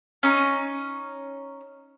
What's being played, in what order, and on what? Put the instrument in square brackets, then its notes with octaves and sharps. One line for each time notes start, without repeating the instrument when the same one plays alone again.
[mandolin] C#4 D#4